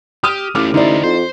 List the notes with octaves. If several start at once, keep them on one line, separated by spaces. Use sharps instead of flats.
G4 D#6 F6 D#7
A1 A3 F4 D6 F6
D3 D#4 E4 C5 D5
F2 C5